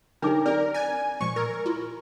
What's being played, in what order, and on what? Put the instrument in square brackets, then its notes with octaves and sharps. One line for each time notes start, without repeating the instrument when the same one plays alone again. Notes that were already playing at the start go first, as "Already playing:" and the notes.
[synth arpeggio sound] D3 F#3 G4 [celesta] D4 D#4 D6 [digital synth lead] A#4
[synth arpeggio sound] C4 G4 [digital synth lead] A#4 [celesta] D5
[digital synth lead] G#5 [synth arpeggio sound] F#6 A6
[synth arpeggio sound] A#2 F3 G#3 [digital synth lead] C#6
[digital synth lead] A#4 [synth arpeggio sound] E6 G#6
[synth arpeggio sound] E4 F4